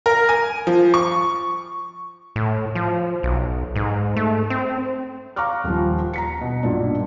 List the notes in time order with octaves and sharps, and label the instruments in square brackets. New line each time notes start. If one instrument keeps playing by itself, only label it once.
[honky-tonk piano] A#4
G#5
F3
C#6
[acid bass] A2
F3
B1
G#2
A3
C4
[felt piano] F5 A#5 C#6 D6 F6 F#6
D#1 F3
A#5 B6 C#7
B2
B1 G2 A#2 D4